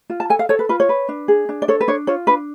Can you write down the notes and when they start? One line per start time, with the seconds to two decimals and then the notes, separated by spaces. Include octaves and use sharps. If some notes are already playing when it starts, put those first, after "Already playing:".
0.10 F4
0.20 A5
0.30 A4 G#5
0.39 F5
0.49 A4 C#5
0.59 B4
0.69 F4 B4
0.80 C#5
0.89 B4
1.09 D4
1.28 G#4
1.49 D4
1.62 D5
1.68 A4 C#5
1.81 B4
1.88 D4 C#5
2.07 F4 C#5
2.27 D4 B4